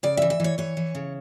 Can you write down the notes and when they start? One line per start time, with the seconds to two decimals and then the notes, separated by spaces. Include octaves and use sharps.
0.03 C#3 D5
0.17 E5
0.22 E3
0.30 E5
0.40 E3 C#5
0.58 E3 C#5
0.77 E3
0.95 C#3